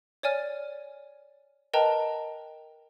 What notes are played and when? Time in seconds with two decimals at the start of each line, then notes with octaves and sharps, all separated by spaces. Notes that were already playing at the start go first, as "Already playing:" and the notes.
0.23 C#5 D5 G#5 F6
1.73 A#4 B4 D#5 G5 A5 A#5